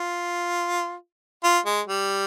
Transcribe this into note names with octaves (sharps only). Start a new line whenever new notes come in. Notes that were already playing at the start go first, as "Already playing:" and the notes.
Already playing: F4
F4
G#3
G3